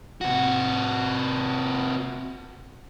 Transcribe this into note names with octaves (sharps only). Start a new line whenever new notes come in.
C3 F#4